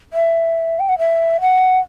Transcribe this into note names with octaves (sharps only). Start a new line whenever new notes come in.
E5
G5
F#5
E5
F#5